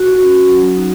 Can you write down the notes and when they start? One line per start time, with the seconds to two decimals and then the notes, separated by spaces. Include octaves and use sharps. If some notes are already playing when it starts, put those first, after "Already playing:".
Already playing: F#4
0.21 C#4 F#4
0.49 F#3
0.76 D#4 F#4